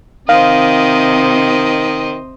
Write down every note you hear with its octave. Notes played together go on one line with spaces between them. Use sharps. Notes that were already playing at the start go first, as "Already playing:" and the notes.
C3 D#3 C5 D#5 F5